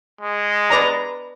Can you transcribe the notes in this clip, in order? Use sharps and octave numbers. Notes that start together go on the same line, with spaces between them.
G#3
B4 D5 A#5